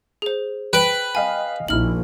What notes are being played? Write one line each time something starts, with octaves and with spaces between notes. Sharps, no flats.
G#4 C5
B4 G5 D7 F#7
D#5 F5 G5 G#5
A#1 D#4 E4 F6 F#7